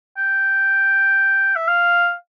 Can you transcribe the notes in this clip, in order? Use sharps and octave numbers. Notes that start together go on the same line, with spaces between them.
G5
E5
F5